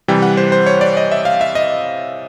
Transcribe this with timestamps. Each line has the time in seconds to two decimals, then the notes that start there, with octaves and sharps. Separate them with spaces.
0.08 C3 E3 G3 G5
0.22 F#5
0.37 C5
0.52 C5
0.66 C#5
0.81 D5
0.97 D#5
1.12 E5
1.25 F5
1.41 E5
1.55 D#5